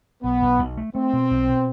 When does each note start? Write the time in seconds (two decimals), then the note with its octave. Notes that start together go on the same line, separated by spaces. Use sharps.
0.23 B1 B3
0.42 B1
0.59 B1
0.77 A3
0.95 A3 C4
1.13 B2
1.31 B1
1.49 B2